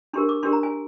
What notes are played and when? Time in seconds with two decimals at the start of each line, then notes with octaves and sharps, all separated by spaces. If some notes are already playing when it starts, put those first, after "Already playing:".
0.13 D4 G4 A#4 C6
0.29 D6
0.43 D4 G4 A#4 C6
0.53 A#5
0.63 G#5